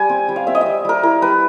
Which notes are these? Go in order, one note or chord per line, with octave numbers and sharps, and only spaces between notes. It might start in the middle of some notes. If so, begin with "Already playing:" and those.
Already playing: G3 G#5
C4
G3
F5
C4 E5
D#5
G3 E5
G3 A#4
E4 A#4
G3 B4